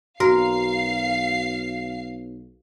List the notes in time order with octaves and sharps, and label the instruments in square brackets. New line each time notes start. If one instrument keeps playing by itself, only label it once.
[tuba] B1 [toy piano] F#4 [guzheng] A#4 [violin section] F5 C7